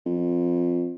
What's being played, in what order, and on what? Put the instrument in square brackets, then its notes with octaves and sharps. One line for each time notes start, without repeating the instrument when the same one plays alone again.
[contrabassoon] F2